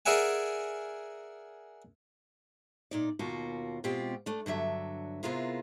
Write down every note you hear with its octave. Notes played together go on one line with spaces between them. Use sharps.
G#4 A#4 D5 E5 F#5 G#5
A#2 D#4 D5
D#2 B2 F4 F#4 A#4
B2 G#3 C4 F4 G4
A3 D4
G2 D3 F#3 E5
C3 B3 E4 F4 G#4 A#4